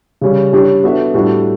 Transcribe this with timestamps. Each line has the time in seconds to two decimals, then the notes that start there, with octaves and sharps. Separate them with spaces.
0.21 C#3 G3 C#4
0.53 G3 D4 G4 C#5
0.83 B3 D4 F#4 A4 E5
1.14 A2 G3 D4 F#4 A4